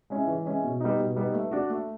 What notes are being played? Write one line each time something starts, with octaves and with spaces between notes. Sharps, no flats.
G#3 C#4 E4
E3
G#3 C#4 E4
B2
G3 B3 D#4
B2
G3 B3 D#4
A3
D4 F#4
A3